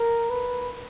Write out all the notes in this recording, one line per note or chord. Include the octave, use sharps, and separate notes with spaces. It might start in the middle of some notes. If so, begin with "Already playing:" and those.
Already playing: A#4
B4